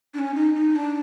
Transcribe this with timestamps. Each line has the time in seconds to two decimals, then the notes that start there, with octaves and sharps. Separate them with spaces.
0.14 D4
0.19 C#4
0.35 D#4
0.55 D#4
0.76 D4